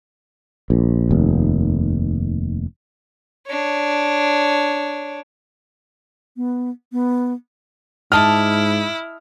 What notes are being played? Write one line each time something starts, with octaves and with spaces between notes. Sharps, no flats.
A#1
F1 D#2
D4 C#5
B3
B3
G#2 E4 D#5 A5 D6 F6